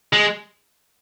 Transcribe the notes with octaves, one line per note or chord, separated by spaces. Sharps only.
G#3